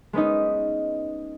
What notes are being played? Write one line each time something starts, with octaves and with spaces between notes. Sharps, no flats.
G#3 B3 C#4 D#4